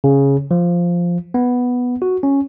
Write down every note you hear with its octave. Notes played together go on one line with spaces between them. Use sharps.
C#3
F3
B3
F#4
C#4